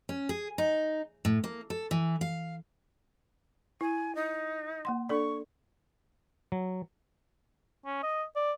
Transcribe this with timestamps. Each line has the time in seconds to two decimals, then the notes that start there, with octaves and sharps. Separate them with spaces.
0.09 C#4
0.29 G#4
0.58 D#4
1.25 A2
1.44 A#3
1.70 A4
1.91 E3
2.21 F5
3.81 E4 G#5
4.15 D#4
4.85 A#3 F#5 C6
5.09 D4 A4 D5 C#6
6.52 F#3
7.86 C#4
8.03 D#5
8.36 D5